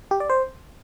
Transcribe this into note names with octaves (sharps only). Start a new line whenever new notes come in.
G4
D5
C5